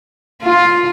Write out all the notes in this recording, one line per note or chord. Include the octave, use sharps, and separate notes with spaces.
F4